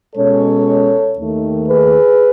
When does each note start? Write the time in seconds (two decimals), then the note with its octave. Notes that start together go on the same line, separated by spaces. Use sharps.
0.16 B2 G#3 C#4 A4 C#5
1.16 D#2 D#3 A3
1.68 G#4 B4